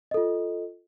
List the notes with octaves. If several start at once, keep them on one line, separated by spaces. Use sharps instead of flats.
F4 A4 D#5